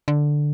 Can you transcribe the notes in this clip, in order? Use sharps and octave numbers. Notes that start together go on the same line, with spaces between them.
D3